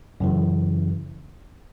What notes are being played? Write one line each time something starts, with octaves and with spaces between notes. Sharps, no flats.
F#2 C#3 E3